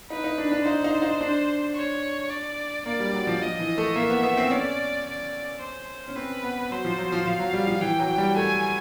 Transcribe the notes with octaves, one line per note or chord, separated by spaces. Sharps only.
D#4 B4
D#4
D4
D4
D#4 C5
D#4
D#4
D4
C#5
D5
A#3 D5
G3
F#3
F3
F3 D#5
E3
A3
A#3 E5
B3
B3
C4
C#4 D5
D5
C5
C#4
C4 B4
B3
F#3 C5
F3
F#3
F3
F3 F5
F#3
G3
F3
E3 G5
F#3
G3
A3 G#5